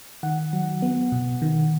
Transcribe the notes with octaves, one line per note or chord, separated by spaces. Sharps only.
D#3 F#5
F#3
B3
B2
D#3